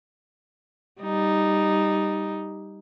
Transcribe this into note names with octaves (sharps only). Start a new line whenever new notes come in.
G3 D#4